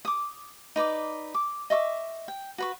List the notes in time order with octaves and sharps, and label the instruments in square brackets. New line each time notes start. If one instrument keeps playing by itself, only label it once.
[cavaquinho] D6 D#6
D#4 B4 D5 D6
D6
D#5 E5 C#6 D6
G5
F#4 B4 C#6